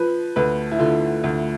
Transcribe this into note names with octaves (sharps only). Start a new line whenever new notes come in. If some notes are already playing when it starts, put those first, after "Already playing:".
Already playing: F3 B4
D2 B4
E4
D3 F4
D2